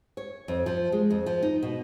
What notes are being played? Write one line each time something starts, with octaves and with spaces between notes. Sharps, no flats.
C#5
F2
F3
G#3
F2
F3
D#4
B2